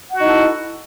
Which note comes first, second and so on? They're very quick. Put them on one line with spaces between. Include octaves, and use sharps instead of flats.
F#5 F#4 D#4 E4 A4